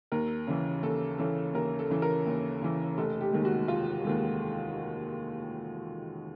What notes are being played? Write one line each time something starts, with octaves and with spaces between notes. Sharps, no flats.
D#2 A#4
C#3 E3
D#2 A4
C#3 E3 A4
D#2 A#4
A4
C#3 E3
A#4
D#2
C#3 E3
F1 A4
G4
D#2 D#3 G#3
F#4
F1 F4
D#2 D#3 G#3